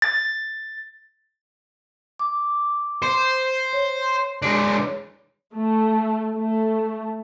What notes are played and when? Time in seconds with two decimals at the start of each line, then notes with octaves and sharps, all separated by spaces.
0.02 A6
2.19 D6
3.03 C5
3.73 C#5
4.42 G#3 D4
5.55 A3
6.35 A3